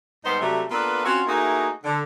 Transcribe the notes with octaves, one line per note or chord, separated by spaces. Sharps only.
G#2 G3 B3 D#4 C5
C3 F#3 G3 A3
A#3 B3 D4 F4 A4 B4
C4 C#4 F4 F#4
A3 A#3 D#4 E4 F#4 G#4
D3